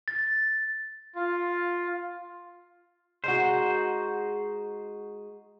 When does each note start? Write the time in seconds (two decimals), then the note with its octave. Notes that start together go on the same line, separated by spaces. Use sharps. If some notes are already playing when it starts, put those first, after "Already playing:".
0.08 A6
1.16 F4
3.24 G#3 D#4 F#4 C5